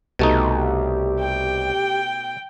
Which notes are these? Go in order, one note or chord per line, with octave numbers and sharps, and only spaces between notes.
C2 B2 A3 D#4 G4
G5